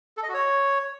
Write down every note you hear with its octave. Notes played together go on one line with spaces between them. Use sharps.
A4
D#5
F#4
C#5